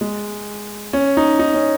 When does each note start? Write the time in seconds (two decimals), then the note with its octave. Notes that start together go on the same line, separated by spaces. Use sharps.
0.01 G#3
0.93 C#4
1.17 D#4
1.39 D#4
1.54 C#4